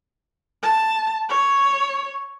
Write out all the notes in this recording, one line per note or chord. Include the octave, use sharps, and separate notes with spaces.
A5
C#5